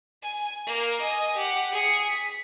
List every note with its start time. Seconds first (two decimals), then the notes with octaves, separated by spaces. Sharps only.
0.23 G#5
0.67 A#3
1.01 D#5 G#5
1.37 G4 F#5
1.72 G#4 C#7
2.10 B6